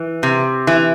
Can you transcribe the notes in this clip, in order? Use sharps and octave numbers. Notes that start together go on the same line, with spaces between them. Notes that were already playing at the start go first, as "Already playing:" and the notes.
Already playing: E3
C3
E3